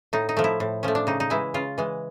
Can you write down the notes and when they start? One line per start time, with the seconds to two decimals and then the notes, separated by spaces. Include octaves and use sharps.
0.13 A2 D#4
0.29 D#4
0.37 F3 A3
0.44 E4
0.60 A2
0.83 F3 A3 C#4
0.95 D4
1.07 C#3 D#4
1.20 D#4
1.30 E3 G#3 E4
1.54 C#3 F4
1.78 E3 G#3